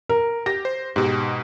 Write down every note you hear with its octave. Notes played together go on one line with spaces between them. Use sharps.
A#4
G4 A#6
C5
G#2 B2 G4